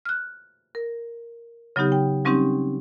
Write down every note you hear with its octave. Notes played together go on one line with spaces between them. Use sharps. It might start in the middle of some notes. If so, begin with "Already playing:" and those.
F6 F#6
A#4
C#3 F#3 B3 D#4 G4
G5
F#3 G3 C4 C#4 D#4 G4